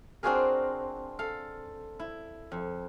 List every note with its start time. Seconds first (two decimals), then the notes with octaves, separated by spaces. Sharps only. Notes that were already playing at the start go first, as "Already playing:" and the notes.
0.23 C4 D4 F4 F#4 G#4 A#4
1.19 A4 F5
1.99 E4
2.52 F2